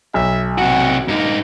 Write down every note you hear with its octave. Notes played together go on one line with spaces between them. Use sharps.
B1 E5
C3 F#4 F#5
G2 A#3 D#4